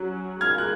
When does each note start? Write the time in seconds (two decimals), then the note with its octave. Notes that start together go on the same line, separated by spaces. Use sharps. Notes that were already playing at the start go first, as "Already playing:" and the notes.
Already playing: F#3 C#4 F#4
0.41 G#3 D#4 A#4 F6 G#6
0.58 F#6